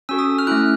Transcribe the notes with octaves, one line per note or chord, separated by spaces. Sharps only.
C#4 F#4 A4 E6
D#6
F6
A3 C#4 E4 F#6